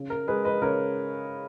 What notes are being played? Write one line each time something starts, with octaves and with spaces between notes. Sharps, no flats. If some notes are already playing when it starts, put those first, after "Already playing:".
Already playing: C#3
A#4
G#3 G#4 B4
B4 D#5
C#3 A#4 C#5